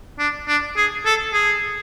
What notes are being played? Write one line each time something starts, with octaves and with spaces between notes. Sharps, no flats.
D4
D4
G#4
A4
G#4